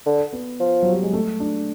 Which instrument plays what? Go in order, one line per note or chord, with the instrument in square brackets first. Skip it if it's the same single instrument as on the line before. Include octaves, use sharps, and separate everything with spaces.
[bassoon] D3
[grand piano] B3
[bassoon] F3
[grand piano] F#3
G3
G#3
A3
D4